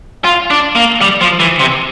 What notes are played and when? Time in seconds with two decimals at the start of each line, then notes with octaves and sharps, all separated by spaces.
0.24 F4
0.50 D4
0.76 A#3
1.01 G3
1.21 F3
1.40 E3
1.60 C3